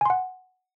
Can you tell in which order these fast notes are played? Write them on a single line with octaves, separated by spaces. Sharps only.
G#5 C6 F#5